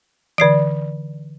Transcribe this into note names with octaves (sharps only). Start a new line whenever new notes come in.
D3 E3 D5 C7 D7